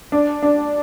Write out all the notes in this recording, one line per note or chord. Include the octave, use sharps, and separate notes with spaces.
D4
D4